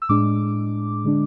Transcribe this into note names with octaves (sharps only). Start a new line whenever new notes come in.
E6
A2 G#3 D4 D6
D3 G#3 D4